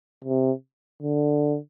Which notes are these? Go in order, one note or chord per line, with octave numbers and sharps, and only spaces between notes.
C3
D3